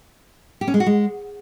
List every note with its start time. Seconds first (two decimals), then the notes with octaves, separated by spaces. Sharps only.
0.61 G4
0.68 C#4
0.74 G#3
0.80 F#4
0.86 G#3